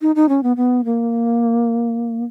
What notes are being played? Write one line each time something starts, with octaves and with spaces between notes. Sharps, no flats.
D#4
D#4
C#4
B3
B3
A#3